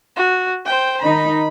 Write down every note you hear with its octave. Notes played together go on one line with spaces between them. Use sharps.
F#4
C5 G5
D#3 D#4 B5